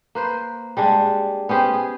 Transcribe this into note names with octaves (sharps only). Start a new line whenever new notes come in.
A#3 B4 C5
G3 G#3 D4
B3 C#4 G4 C5
G#4